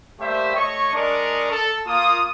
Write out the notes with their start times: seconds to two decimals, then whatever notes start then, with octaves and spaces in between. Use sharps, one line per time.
0.20 G3 A3 A#3 G4 C5 E5
0.55 A3 C#5 D#5 C#6
0.93 G#3 D4 A#4 D5 D#5 C#6
1.51 A4
1.86 A#3 F4 D#6